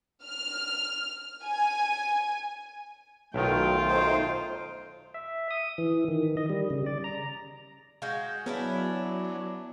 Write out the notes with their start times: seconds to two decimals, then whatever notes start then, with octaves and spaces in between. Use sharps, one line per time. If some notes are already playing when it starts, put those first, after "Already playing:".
0.24 F6
1.44 G#5
3.34 B1 D#3 F#3 A3 F4 G5
3.87 A3 D#4 C5
5.14 E5
5.51 D#6
5.78 E3
6.08 D#3
6.37 D#5
6.49 G3
6.70 C#3
6.86 D5
7.04 A#5
8.02 G#3 F#4 F5 G6
8.46 F#3 B3 C#4 D4 E4